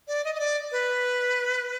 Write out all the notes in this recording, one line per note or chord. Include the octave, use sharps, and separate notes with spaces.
D5
D#5
D#5
D5
B4